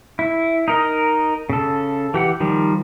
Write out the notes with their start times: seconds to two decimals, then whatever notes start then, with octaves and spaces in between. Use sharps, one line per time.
0.19 E4
0.68 D#4 A#4 D#5
1.50 C#3 A4
2.14 E3 G4 F#5
2.40 D#3 F3 G3